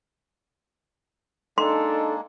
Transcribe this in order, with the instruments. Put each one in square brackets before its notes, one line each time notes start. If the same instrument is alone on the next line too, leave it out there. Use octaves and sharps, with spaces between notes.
[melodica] G#3 A#3 [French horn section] D4 D#4 [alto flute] A4 [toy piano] C6